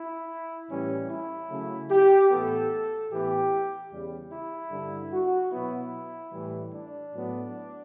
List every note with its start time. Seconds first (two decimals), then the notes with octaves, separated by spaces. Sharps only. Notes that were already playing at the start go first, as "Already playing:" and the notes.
Already playing: E4
0.69 A2 E3 G3 C#4
1.09 E4
1.50 C#3 F#3 A3
1.91 G4
2.30 A2 E3 B3 A4
3.11 A2 E3 B3 G4
3.91 E2 C#3 G3
4.32 E4
4.72 G2 D3 G3
5.13 F#4
5.52 B2 F#3 B3 E4
6.33 A2 E3 G3
6.73 D4
7.13 A2 F#3 B3